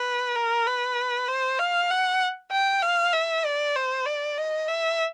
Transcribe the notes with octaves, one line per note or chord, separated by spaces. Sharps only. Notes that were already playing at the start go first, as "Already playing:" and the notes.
Already playing: B4
A#4
B4
C5
F5
F#5
G5
F5
E5
D5
C5
D5
D#5
E5